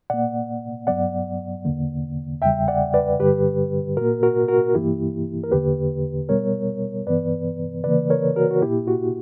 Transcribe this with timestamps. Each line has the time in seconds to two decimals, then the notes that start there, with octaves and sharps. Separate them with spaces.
0.10 A#2 A#3 D5 F#5
0.87 G2 F#3 B3 D5 F#5
1.65 E2 D3 A#3
2.42 E2 C#3 G3 E5 G5
2.68 D5 F#5
2.94 B4 D5
3.20 G2 D3 G3 G4 B4
3.97 A#2 A#3 F#4 A#4
4.23 F#4 A#4
4.48 F#4 A#4
4.75 G2 E3 A#3 E4 G4
5.44 A#4
5.52 E2 D3 A#3 G4 B4
6.29 B2 G3 B3 A#4 C#5
7.07 G2 E3 B3 B4 D5
7.84 C#3 E3 A#3 B4 D5
8.10 A#4 C#5
8.36 F#4 A#4
8.51 F#4
8.62 A#2 A#3 E4 G4
8.88 F#4